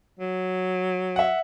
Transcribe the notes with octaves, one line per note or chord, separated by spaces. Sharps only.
F#3
E5 F#5